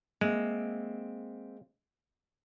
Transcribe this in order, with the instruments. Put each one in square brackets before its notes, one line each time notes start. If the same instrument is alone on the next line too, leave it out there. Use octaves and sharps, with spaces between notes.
[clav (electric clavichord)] G#3 [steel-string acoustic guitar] A#3 C4 E5